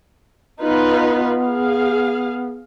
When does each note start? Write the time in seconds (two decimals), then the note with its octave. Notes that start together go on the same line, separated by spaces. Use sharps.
0.61 B3 D#4 F4 B4
1.43 G#4 F5